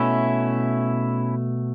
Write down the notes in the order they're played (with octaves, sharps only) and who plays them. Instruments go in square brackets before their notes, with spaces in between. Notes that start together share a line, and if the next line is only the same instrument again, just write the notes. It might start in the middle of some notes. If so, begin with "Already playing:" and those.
Already playing: [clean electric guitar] B2 A3 C#4 E4